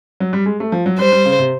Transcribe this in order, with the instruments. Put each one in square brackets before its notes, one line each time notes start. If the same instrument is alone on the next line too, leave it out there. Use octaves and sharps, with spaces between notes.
[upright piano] F#3
G3
G#3
A3
F3
F#3
[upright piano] G3 [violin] C5
[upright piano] G3
C#3
C3